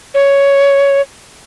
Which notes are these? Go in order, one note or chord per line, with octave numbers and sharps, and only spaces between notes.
C#5